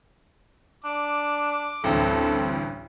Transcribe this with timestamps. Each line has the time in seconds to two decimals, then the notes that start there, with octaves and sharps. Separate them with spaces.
0.84 D4 D6
1.84 A1 D2 G2 C4 A4